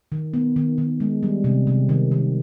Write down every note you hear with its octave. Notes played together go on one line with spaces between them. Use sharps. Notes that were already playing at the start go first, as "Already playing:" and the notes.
D#3
B3
D#3
D#3
G#3
G3
C3
C3
D#3
D#3